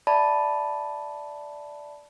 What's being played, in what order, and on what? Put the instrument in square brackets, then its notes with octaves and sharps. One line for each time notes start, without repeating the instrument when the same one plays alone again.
[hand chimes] D5 E5 A5 B5